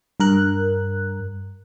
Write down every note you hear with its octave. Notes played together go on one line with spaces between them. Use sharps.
G2 A#4 F#6